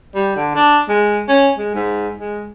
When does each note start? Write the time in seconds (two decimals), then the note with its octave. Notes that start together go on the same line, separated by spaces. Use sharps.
0.15 G3
0.36 D3
0.56 D4
0.89 G#3
1.29 C#4
1.59 G#3
1.75 G#2
2.18 G#3